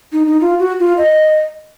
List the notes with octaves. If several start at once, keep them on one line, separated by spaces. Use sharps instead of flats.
D#4
D#4
F4
F#4
F4
D#5